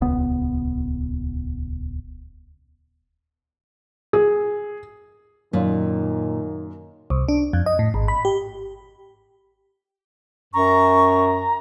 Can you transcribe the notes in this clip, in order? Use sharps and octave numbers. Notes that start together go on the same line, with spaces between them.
D#1 C#2 B3
G#4
F#2 A#2 D#3
C2
D4
F2
D#5
A2
G#1
B5
G4
F#2 A#5 C#6